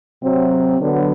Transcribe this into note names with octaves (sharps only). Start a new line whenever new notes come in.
C3 F#3 C4
D3 F#3 B3